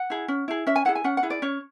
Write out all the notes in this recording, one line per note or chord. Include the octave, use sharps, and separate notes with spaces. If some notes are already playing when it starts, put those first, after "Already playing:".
Already playing: F#5
E4 G#4
C#4
E4 G#4
C#4 E5
G#5
E4 G#4 F#5
G#5
C#4 F#5
F#5
E4 G#4
D5
C#4 C#5